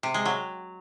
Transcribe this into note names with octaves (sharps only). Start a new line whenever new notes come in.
C3
G#3
F#3